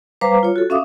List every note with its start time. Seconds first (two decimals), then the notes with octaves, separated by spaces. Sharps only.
0.21 G3 B4 C5 F5 A#5 D6
0.43 F4 C#5
0.56 F#4 A4
0.70 C#4 E5 F5 D6 D#6